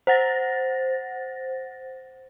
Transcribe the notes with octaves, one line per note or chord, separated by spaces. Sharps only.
C5 F#5 A6 A#6